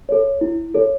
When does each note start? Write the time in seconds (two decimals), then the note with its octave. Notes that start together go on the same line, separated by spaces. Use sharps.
0.09 A4 C#5
0.41 E4
0.75 A4 C#5